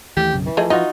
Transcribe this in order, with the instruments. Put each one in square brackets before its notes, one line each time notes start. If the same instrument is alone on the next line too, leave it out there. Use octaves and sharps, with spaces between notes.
[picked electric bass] D#2 E3 A3 [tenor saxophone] G4
[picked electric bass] B1 F#2 C#3
[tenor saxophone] E3
[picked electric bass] F3 [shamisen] A3 G#4 D#5
[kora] D#4 F4 F#4 [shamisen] D#5